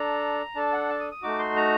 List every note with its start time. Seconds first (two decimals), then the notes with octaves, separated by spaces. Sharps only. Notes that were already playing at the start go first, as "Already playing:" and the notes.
Already playing: D4 A4 A#5
0.55 D4 A4 A5
0.73 F#5
0.89 A5
1.00 D#6
1.11 D#6
1.22 A3 D#4 F#4 D6
1.39 C6
1.56 A#5